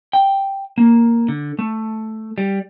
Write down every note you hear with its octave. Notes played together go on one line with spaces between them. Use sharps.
G5
A#3
D3
A3
G3